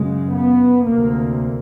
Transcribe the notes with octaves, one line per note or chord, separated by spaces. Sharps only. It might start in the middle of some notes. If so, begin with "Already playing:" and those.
Already playing: F#2 C#3 G#3
B3
D2 C3 A#3